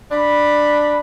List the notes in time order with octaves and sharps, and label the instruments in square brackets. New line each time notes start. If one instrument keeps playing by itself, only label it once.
[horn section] D4 B5